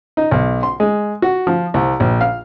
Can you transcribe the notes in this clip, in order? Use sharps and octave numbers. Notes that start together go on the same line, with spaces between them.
D#4
B1
C6
G#3
F#4
F3
C2
A#1
F5